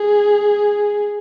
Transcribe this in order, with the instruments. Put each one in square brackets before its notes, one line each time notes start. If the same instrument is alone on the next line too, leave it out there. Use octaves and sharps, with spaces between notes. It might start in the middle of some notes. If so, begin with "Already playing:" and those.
Already playing: [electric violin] G#4